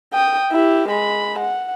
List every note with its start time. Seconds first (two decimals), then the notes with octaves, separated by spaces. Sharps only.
0.13 G5 D#6
0.52 E4 G4
0.89 G#3 B5
1.39 F#5